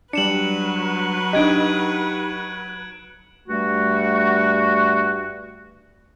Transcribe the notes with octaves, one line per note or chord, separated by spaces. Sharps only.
F#3 G3 D4 B4 C#7 E7 F#7
D4 D#4 G4 D#5 F#6 G#6 D7
G2 G3 A3 F#4